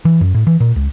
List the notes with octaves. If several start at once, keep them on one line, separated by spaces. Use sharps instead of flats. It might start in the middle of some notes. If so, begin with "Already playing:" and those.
E3
F#2
A2
E3
A#2
C#2